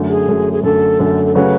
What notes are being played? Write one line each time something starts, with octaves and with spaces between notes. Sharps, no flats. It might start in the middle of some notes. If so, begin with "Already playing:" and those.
Already playing: F#2 D3 A3
G#4
F#2 D3 A3
G#4
F#2 D3 A3 A4
F#2 D3 A3
A4
C#3 F#3 A3 C#4 F#4 B4